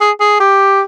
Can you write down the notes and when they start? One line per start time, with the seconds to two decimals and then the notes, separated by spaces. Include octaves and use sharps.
0.01 G#4
0.20 G#4
0.40 G4